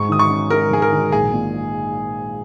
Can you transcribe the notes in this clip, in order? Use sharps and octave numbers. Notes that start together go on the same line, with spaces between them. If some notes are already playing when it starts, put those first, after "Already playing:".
Already playing: G#2 C#6
D#3 D#6
C#6
C#4
G#3 A#4
G#2 G#4
A#4
D#3
A#1 G#4
A#2